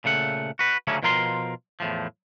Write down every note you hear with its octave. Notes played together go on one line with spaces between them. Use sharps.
A#2 C#3 A3 F#5
F#4 B4
D2 C#3 F#3 A3 A#3 C#4
B2 F3 F4 A#4 F#5 C6
E2 A2 F3